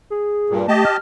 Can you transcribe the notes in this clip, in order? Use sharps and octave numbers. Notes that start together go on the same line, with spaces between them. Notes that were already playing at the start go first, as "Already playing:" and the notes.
G#4
G2 A#2
A3 G4 D#5 A5
F6